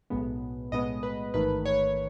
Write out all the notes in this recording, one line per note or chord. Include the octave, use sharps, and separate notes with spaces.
B1 A2 G#3 B3
B1 A2 G#3 B3 D#5
B4
A1 G#2 D#3 A3 B4
C#5